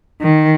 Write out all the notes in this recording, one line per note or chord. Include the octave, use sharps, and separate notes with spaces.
D#3